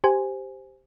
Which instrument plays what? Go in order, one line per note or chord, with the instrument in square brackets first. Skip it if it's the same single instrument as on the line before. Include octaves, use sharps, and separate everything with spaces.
[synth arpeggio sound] G4 C5 G#5